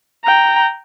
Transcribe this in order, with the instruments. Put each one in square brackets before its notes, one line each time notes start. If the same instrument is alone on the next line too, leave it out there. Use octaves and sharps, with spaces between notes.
[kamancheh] G5 A#5